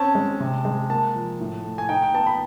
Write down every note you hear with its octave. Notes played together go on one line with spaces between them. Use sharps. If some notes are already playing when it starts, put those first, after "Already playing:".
Already playing: C4 C#4 A5
G#3
C3
G#3
A#3 A5
F3
A2
A3
G#5
D#4 G5
G5
B3 A5
B5